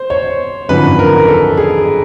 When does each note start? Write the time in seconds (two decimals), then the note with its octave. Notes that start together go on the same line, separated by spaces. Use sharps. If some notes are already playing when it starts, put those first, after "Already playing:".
Already playing: C5
0.10 C#5
0.69 G#1 F#2 D3 F3 B4
0.99 A#4
1.28 A4
1.57 G#4